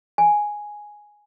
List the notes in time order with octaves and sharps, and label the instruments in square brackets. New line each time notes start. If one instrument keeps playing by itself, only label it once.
[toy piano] G#5